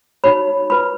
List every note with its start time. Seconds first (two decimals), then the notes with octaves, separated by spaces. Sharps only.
0.24 D#4 F#4 C#5 B5
0.70 F4 B4 B5